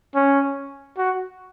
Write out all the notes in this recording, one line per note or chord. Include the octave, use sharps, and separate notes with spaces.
C#4
F#4